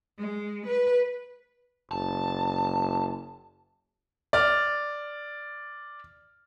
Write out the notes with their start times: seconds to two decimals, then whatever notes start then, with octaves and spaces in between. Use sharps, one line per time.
0.19 G#3
0.66 B4
1.91 F#1 A5
4.33 D5 F6